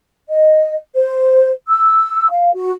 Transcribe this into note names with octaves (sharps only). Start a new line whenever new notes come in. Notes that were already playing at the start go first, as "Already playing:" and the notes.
D#5
C5
E6
F5
F#4